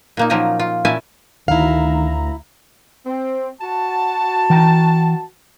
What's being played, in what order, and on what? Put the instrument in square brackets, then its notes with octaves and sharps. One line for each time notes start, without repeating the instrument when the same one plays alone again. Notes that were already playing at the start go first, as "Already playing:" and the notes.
[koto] A#2 A#3 D#4
F3 F#3 A#3 C#4 D#4 D#5
F4
A#2 C#4 E4 E5 G#5 A5
[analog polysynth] D2 A#5 [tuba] D#3 [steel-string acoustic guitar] E4 F5
[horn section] C4
F#4 A5
[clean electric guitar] E3 G5 A#5